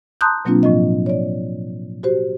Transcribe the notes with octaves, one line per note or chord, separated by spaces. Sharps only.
A5 A#5 C6 D#6 F#6 G6
B2 F#3 A#3 C4 D4 F4
A2 F3 F4 D#5
C#5 D5
F#4 G4 C5